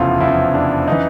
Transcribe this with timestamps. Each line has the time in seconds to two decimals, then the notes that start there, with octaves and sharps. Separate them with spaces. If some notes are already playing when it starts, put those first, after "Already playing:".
Already playing: F1 E2 C#3 F3 E4 F4
0.21 F1 E2 C#3 F3 E4
0.54 D4
0.88 C#3 E3 D#4